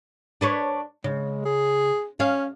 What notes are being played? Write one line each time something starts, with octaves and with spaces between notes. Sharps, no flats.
D4 B4 C#5
C#3 G#3
G#4
C#4 F5